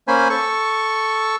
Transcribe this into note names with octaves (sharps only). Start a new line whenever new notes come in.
A#3 C#4 C5 G#5 B5
A4 C#6